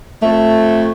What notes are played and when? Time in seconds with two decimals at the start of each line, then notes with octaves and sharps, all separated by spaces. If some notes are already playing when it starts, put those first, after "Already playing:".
0.21 F2 A3